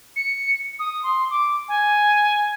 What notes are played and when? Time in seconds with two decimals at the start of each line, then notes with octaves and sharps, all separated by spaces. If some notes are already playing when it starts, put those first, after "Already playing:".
0.16 C#7
0.79 D#6
1.03 C6
1.30 D6
1.68 G#5